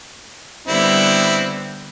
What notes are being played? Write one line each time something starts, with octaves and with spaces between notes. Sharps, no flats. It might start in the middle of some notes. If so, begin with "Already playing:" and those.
D3 G3 B3 C4 E4